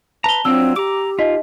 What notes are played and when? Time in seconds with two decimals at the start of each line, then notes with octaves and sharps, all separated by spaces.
0.24 B4 A5 A#5 F7 G7
0.45 F#3 C4 D4 F4 E6
0.76 G4 A#5 D6
1.19 D#4 F4 D#5 B6